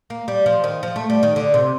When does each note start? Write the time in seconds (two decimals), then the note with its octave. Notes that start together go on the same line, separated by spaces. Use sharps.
0.10 A#3
0.28 G3
0.46 F3
0.64 D#3
0.83 F3
0.96 A3
1.10 G3
1.23 D#3
1.36 D3
1.54 C3